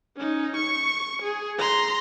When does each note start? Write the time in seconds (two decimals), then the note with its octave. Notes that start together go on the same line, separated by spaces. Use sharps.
0.17 C#4 D#4
0.56 C#6 C#7
1.22 G#4
1.59 A#5 C6